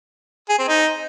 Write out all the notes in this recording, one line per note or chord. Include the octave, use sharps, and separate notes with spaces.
G#4
C4
D#4